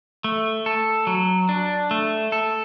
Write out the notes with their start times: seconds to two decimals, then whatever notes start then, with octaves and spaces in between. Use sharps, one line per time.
0.24 A3
0.66 A4
1.07 F#3
1.49 D4
1.91 A3
2.32 A4